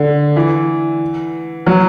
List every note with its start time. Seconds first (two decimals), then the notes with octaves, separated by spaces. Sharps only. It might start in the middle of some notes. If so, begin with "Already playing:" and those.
Already playing: D3
0.36 E3
1.66 F#3